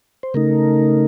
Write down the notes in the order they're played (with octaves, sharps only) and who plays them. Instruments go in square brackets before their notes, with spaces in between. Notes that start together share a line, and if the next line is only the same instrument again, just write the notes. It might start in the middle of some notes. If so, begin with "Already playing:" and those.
[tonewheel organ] C5
C#3 A3 D#4 A#4